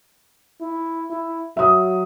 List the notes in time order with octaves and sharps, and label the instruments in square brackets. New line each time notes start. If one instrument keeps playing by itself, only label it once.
[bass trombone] E4
E4
[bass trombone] F#3 [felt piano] E5 D#6